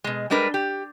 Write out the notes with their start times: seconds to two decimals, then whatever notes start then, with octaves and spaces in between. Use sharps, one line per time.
0.04 B2 G#3
0.30 G3 G#3 D4 A#4 B4
0.54 G4